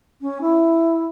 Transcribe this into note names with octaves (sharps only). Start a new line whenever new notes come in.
C#4
E4